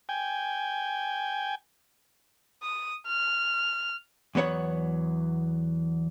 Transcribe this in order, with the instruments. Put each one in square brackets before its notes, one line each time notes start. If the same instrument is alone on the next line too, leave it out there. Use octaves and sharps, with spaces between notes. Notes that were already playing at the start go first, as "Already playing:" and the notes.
[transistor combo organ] G5 G#5
[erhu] D#6
F6
[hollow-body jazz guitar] E2 F#3 B3 C#5 F#5